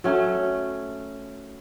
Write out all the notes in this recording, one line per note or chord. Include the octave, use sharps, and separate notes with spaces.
F#3 A3 C#4